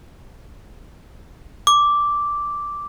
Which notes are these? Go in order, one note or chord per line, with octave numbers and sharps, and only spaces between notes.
D6